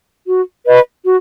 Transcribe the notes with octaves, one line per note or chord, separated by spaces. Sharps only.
F#4
B4 D#5
F#4